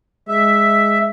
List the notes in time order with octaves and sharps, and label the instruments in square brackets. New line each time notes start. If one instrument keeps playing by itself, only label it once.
[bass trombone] G#3 [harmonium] E5